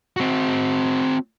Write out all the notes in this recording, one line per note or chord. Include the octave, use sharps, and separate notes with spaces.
C4 F#4